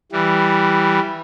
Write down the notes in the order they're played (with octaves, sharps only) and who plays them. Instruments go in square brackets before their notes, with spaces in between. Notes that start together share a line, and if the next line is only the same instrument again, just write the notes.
[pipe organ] E3 G3